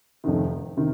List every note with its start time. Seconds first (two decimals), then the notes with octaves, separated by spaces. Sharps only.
0.24 F1 F2 C3 D#3
0.77 C3 D#3